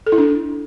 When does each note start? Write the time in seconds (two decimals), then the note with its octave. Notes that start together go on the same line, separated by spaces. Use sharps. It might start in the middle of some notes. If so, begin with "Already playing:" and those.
0.06 A4
0.12 E4
0.18 D4